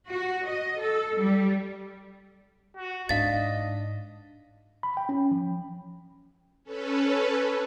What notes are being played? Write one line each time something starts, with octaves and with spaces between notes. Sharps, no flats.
F#4
D#5
A4
G3
F#4
G#2 D4 D#5 F5 A6
B5
G5
C#4
F3
C#4 A4 B4